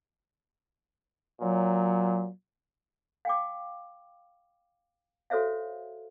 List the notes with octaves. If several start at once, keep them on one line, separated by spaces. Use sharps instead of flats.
A#2 F#3
F5 G5 D6
F#4 A4 C5 C#5 E5 F5